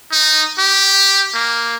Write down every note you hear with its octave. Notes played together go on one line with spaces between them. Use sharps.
D#4
G4
A#3